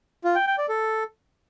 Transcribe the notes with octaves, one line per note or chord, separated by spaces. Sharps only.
F4
G5
G5
D5
A4